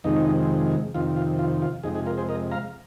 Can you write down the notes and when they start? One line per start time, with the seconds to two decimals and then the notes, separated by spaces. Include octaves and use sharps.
0.04 F2 C3 D#3 G#3 D#4
0.94 F2 C3 D#3 F4
1.16 F4
1.39 F4
1.62 F4
1.83 F2 C3 G#3 D#4 G#4
1.95 D#4 G#4
2.07 F4 A#4
2.18 G#4 C5
2.29 A#4 D#5
2.51 F5 A#5